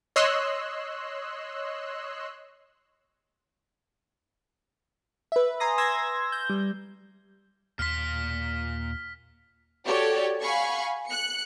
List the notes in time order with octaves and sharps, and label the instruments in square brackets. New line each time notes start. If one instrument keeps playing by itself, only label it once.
[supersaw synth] C#5 D#5 C6 E6 F#6
[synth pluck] B4 E5
G#5 A#5 C6 D#6 A#6
C6 E6 G#6 A#6
G6
G3
[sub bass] D#2 [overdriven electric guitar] A#2 C6 [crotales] F6 B6
[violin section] F#4 G4 A4 C#5 D5
F5 F#5 G#5 B5 C#6
F#6 C#7